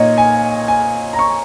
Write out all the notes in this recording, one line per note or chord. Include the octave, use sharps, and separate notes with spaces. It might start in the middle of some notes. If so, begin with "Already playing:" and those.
Already playing: A#2 A#3 D#4 C#5 D#5
G#5
G#5
A#5
C#6